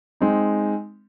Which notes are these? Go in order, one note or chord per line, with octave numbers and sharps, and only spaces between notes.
G#3 C4 D#4